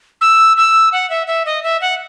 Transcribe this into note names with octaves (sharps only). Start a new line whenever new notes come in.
E6
E6
F#5
E5
E5
D#5
E5
F#5